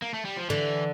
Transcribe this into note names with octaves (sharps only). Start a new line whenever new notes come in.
A#3
A3
G3
F3
D3 E3